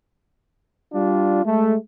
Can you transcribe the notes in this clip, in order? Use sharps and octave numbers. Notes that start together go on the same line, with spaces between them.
G3 D4 F4
G#3 A3